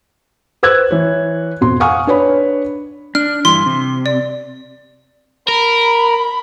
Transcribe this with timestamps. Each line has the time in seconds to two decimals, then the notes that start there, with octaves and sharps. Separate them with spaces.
0.63 B4 C5 E6 F#6 G#6
0.91 E3 C#5
1.61 F2 B2 C6
1.80 F5 F#5 G#5 C#6 D#6 F6
2.07 D4 B4 C#5 B5
3.15 D4 F6
3.45 G2 E3 C6
3.66 C3
4.06 D5
5.48 A#4 B5